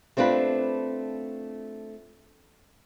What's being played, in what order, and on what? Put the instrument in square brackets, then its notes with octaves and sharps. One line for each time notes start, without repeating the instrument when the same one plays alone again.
[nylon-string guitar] A3 C4 D4 F4 B4